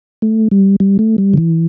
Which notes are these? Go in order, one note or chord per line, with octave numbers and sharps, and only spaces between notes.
A3
G3
G3
A3
G3
D3
E3